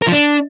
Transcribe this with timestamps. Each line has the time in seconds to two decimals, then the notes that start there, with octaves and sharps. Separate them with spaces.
0.02 A#4
0.07 F3
0.12 D4